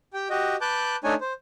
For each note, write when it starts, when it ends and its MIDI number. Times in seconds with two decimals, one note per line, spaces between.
0.14 0.28 67
0.14 0.28 79
0.30 0.56 66
0.30 0.56 67
0.30 0.56 75
0.61 0.96 71
0.61 0.96 81
0.61 0.96 86
0.61 0.96 90
0.61 0.96 91
1.04 1.14 57
1.04 1.14 62
1.04 1.14 63
1.04 1.14 73
1.04 1.14 80
1.21 1.33 72